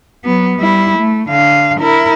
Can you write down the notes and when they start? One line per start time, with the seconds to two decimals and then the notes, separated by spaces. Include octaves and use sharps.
0.25 F#3 B3
0.57 G3 E4
0.98 A3
1.29 D3 F5
1.80 E4 A#4